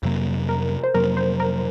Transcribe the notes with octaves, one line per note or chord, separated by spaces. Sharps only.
F2 C3 F#3 A#3
A#4
C5
F2 C3 F#3 A#3 A#4
C5
A#4